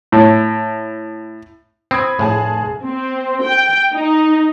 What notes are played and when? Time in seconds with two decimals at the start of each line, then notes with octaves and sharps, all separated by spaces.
0.12 A2
1.91 C4 B5 D#6 G#6
2.19 F1 A2 G#4 A5
2.83 C4
3.42 G5
3.93 D#4